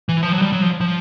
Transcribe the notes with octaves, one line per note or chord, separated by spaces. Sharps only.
E3
F3
F#3
G3
F#3
F3
F3